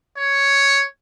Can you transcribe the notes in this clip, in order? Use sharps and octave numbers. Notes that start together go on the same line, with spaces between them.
C#5